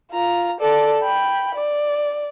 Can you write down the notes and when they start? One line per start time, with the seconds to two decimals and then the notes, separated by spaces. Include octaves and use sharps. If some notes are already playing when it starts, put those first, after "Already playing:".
0.12 F4 A#5
0.60 A4 D5
1.02 G5 B5
1.55 D5